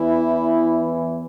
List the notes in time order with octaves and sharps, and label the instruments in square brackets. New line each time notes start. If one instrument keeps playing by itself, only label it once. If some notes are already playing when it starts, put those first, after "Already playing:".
Already playing: [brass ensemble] E2 E3 [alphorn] E4